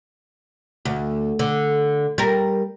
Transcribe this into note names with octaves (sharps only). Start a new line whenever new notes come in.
D2
D3
G3 A#4